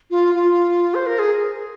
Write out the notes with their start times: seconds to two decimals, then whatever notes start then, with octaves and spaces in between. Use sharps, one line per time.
0.11 F4
0.34 F4
0.95 C5
1.06 A#4
1.19 G#4